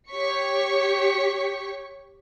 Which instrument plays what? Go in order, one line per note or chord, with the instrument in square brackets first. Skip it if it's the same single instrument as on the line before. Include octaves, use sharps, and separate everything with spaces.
[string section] G4 C#5 C#6 B6 C#7